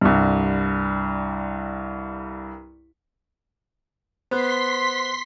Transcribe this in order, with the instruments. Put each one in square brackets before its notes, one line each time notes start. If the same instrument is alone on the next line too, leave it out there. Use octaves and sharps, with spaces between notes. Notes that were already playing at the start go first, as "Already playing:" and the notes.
[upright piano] C2 G2
[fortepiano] B3 [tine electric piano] C5 F#6 [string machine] C6 B6